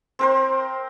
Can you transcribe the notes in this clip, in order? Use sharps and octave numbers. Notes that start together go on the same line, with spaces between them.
C4 A#4 C5